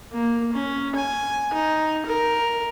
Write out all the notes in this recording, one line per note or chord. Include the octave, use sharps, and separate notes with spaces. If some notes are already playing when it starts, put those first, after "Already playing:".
A#3
C#4
G#5
D#4
A#4